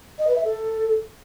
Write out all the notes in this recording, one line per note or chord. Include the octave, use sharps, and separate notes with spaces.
D#5
B4
E5
A4